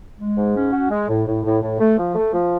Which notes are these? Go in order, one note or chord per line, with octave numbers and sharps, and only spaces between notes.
G#3
G#2
C#4
F#4
G#3
A2
A2
A2
A2
A3
F3
A3
F3